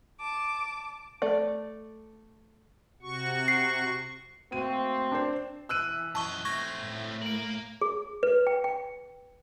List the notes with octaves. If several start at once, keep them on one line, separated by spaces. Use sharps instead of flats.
A5 D6
A3 D5
C3 F#4 C#6
C7
A3 A#3 C4 F#4 D#7
D4 C5
E3 E6 F#6 D#7
F#2 D#5 A5 C#6 G7
A3 C4 C#6 G#6 A#6
A2
A#3 A#4 D7 F#7
G#4
B4
G5
G5